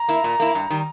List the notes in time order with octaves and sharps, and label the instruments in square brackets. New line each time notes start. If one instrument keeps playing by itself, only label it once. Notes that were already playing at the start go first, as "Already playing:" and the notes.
Already playing: [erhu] A#5
[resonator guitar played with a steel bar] A#3 E4
A#2
A#3 E4
G2
D#3 G3